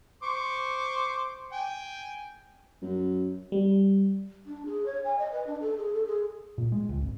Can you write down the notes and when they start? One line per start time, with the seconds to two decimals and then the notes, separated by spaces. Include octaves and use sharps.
0.23 C5 C#6 D6
1.52 G5 G#5
2.82 F#2
3.52 G3
4.46 D4
4.66 G#4
4.86 C#5
5.04 G#5
5.19 D#5
5.32 B4
5.47 D4
5.60 A4
5.77 G#4
5.93 A4
6.07 G#4
6.58 A#2
6.72 G#3
6.89 C#2
7.01 G#1